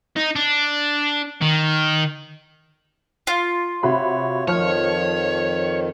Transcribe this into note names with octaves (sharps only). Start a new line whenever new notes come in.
D#4
D4
D#3
F4
C3 F#4 C#5 B5
F2 D#3 F3 C#5 F6